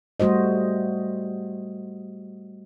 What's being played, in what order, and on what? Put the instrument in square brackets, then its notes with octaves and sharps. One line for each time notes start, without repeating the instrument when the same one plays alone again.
[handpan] G3 A3 F#4 C5 D#5